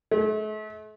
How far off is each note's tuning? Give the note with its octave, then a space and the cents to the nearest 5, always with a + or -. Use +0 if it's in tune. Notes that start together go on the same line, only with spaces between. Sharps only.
A3 -45